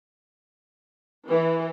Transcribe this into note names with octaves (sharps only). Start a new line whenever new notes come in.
E3